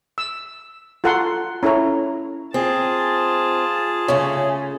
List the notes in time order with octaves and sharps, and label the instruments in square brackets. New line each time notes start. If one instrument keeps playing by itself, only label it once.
[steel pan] E6
F4 F#4 A4 F#5 A#5 C6
C#4 E4 A4 C#5 A#5
[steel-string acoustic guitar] C4 [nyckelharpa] F4 A5 [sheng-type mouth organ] G#4
[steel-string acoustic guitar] C#3 A3 C#4 [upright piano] C#5